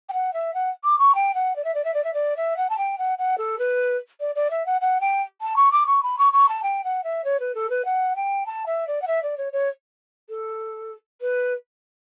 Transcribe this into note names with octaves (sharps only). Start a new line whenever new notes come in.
G5
F#5
E5
F#5
D6
C#6
G5
F#5
D5
E5
D5
E5
D5
E5
D5
E5
F#5
A5
G5
F#5
F#5
A4
B4
D5
D5
E5
F#5
F#5
G5
A5
C#6
D6
C#6
B5
C#6
C#6
A5
G5
F#5
E5
C#5
B4
A4
B4
F#5
G5
A5
E5
D5
F#5
E5
D5
C#5
C#5
A4
B4